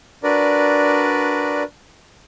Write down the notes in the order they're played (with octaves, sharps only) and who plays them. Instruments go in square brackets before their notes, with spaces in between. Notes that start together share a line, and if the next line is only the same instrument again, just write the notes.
[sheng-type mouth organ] D4 F#4 A#4 B4 D5